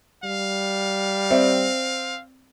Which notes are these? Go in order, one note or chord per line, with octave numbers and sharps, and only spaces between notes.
G3 F5
C4 D5 E5